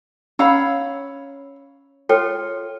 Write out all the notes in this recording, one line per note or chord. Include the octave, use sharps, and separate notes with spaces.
C#4 C#5 F5 A#5 B5 E6
F4 A4 C#5 G5